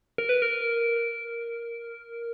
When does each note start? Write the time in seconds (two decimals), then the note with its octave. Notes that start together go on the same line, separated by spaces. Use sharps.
0.18 A#4
0.29 B4
0.42 A#4